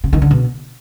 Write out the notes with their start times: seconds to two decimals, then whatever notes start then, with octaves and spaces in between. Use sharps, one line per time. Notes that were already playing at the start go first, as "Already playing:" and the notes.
0.04 C3
0.13 D#3
0.22 D3
0.31 B2